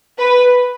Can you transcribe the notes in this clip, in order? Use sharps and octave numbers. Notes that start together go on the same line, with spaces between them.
B4